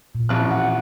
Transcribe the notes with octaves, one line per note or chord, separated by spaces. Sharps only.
A#2
A1 F2 F#6
F#5